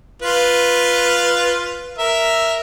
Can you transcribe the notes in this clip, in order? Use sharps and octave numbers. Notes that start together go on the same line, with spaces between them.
F4 B4
A#4 E5